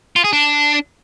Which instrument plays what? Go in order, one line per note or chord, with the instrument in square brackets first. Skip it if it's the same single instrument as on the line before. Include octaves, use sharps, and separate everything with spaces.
[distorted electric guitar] F4
G#4
D4